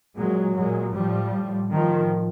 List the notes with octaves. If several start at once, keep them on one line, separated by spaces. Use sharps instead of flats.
A#2 F#3 G#3
A#2 F#3 G#3
A2 F3 G3
A2
A2 D#3 F3